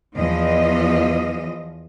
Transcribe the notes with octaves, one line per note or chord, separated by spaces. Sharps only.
E2 F3 D#5